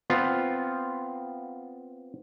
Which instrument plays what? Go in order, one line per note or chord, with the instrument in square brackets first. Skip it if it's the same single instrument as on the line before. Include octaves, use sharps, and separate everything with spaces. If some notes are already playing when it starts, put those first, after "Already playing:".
[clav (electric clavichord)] B3 C4 F4